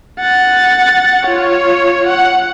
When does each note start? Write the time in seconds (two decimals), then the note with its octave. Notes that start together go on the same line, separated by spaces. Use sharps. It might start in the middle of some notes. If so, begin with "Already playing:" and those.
0.19 F#5 A6
1.26 F4 C#5
2.07 F#5